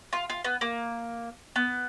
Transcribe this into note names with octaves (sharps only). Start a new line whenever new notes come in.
F4
F4
B3
A#3
B3